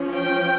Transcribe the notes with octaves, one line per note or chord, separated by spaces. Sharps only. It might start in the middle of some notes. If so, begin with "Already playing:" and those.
Already playing: F3 C#4
G5